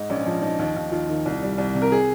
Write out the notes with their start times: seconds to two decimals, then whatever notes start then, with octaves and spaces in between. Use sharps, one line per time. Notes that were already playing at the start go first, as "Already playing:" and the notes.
Already playing: G#2 D#4
0.10 A#1 C#4
0.26 F3 D#4
0.42 F3 D#4
0.59 D#2 D#4
0.76 D#2
0.92 D#2 F4
1.09 D#3
1.26 C2
1.42 G3
1.58 C2
1.75 C3
1.82 A#4
1.92 G#4